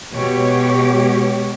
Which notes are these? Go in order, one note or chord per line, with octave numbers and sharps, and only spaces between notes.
B2 G#3 G4 C#5